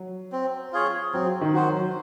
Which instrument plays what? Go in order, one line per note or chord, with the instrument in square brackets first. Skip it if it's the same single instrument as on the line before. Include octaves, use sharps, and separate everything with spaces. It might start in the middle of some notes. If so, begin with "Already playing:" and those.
Already playing: [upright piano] F#3
[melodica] C4
F4 G#4 C#5
[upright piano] F#3 [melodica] C4
[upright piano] D#3
[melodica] F#4 C5
[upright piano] F#3